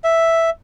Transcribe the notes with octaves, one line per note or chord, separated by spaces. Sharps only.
E5